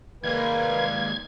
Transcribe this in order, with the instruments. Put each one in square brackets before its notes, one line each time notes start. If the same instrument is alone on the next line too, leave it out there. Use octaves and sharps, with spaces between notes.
[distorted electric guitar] D#2 G#3 [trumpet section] G3 F5 [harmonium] A#3 B4 [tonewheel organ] G#6